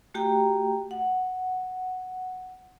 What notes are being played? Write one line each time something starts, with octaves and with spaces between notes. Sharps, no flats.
A3 F#4 G4 G5 A#5
F#5